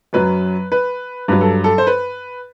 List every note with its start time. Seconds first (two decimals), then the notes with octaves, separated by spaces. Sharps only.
0.13 F#2 F#3 B4
0.72 B4
1.28 G2 F#3 B4
1.41 A4
1.64 A4
1.78 C5
1.87 B4